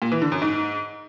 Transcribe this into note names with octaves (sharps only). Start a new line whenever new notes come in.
A#2
E3
D3
F#2
G#2